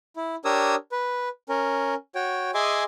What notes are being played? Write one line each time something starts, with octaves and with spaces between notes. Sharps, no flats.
E4
D4 G4 A#4 C#5 D#6 E6
B4
C#4 A#4
F#4 C#5 G5
G#4 D#5 E5 G#5 C6 D6